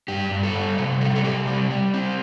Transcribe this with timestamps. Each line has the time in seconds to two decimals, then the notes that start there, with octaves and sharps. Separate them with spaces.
0.08 G2 G4
0.31 G2
0.43 A4
0.55 G3
0.78 C3 A4
1.01 G3 A4
1.16 A4
1.24 C3 G4
1.47 G3
1.71 G3
1.94 C4